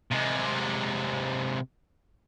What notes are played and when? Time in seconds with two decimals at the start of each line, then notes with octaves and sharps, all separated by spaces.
0.11 C3 G#3